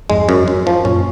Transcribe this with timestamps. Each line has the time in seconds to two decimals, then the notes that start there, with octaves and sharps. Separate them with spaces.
0.10 F2 G#2 G#3
0.29 F#2
0.48 F#2
0.67 F3
0.85 F#2 A#2 C#4